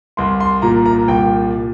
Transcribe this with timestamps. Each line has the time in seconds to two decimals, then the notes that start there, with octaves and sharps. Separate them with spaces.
0.17 C2 C6
0.40 C6
0.62 A#2 A#5
0.86 A#5
1.08 C2 G5